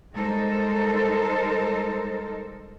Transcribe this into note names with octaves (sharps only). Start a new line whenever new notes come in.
G3 G#3 D#4 A4 A#4 C5